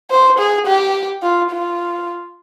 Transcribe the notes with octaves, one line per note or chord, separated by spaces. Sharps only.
C5
G#4
G4
F4
F4